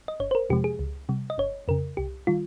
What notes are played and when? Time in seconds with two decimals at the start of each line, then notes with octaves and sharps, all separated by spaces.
0.08 D#5
0.20 G1 C#5
0.31 C5
0.35 A#4
0.50 F2 C3 F3 G#3 G4
0.64 G#4
0.79 C#2
1.09 C3 G3
1.30 D#5
1.38 G1 C#5
1.68 F2 C#3 A#4
1.97 C2 G4
2.27 D#3 G3 F4